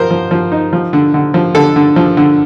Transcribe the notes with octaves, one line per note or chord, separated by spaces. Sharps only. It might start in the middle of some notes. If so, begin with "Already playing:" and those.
Already playing: F3 A#4 C5
F3
F3
D#4
F3
D3
D3
F3
D3 A4
D3
F3
D3